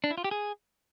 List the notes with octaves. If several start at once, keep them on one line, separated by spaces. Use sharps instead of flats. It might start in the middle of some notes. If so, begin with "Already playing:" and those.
D4
E4
F4
G4
G#4